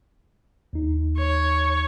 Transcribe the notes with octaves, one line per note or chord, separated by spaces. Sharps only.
D#2 D#4
C#5